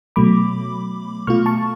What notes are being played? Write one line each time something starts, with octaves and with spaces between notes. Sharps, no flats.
B2 F#3 A3 B5 D6
B2 A3 F4 C#6 F6
A5 C#6